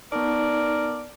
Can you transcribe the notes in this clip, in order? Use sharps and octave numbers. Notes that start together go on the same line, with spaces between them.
B3 D#4 A#4 D5 A5